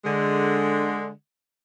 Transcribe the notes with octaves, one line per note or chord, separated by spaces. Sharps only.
D3 G#3